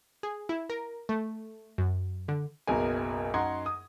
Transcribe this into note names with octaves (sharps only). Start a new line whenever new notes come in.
G#4
E4
A#4
A3
F#2
D3
F#1 B1 B2 F#3 A#4 G#5
F#2 D#4 F#5 A#5 C6 G#6
D#6